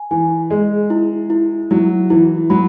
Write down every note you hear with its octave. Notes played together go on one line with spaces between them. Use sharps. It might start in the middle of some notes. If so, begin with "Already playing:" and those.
Already playing: G#5
E3 G#5
G#3 G#4
E4
E4
F#3 E4
E3 E4
F#3 B5